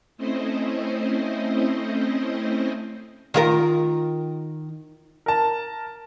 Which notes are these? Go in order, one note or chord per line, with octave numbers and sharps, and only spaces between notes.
A3 C4 C#4 E4 C5 D#5
D#3 F4 A#4
A#4 A5